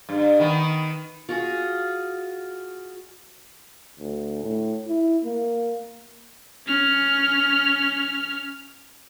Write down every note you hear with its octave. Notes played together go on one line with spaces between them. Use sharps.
G2
D#3 B3
F4 F#4 G#4
D2
A2
E4
A#3
C#4 F6